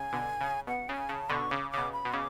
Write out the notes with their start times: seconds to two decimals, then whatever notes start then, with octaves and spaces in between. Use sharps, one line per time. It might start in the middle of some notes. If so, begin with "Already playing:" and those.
Already playing: C#3 G#5
0.12 B2 D3
0.41 C#3
0.67 B2 F#5
0.89 C#3 G#5
1.09 C#3 A5
1.29 B2 D3 C#6
1.50 C#3 D6
1.71 C#3 D6
1.78 B2
1.92 B5
2.05 B2
2.13 C#3 D6